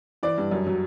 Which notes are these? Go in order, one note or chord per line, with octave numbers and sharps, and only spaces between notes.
E3 D5
G2
F#2
F#3